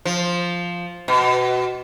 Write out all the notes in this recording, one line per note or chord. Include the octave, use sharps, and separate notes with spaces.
F3
B2